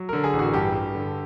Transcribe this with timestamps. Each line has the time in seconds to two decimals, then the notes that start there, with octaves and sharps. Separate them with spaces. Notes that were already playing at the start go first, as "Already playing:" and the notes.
Already playing: F#3
0.09 D3 A#4
0.24 G#4
0.33 A1
0.39 F#4
0.54 G2 G4
0.75 G2
0.95 D3